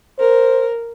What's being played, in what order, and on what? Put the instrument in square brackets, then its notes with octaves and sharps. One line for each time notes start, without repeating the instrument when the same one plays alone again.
[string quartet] A#4 [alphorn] C5